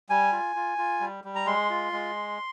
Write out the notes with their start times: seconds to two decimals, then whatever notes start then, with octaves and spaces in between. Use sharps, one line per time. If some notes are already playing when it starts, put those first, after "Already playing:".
0.09 G3 G#5
0.32 F4
0.56 F4
0.78 F4
1.00 G3
1.24 G3
1.35 A#5
1.46 G#3 C6
1.70 F4
1.92 G#3